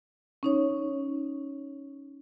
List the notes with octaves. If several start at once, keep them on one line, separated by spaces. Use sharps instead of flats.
C#4 D#4 C#5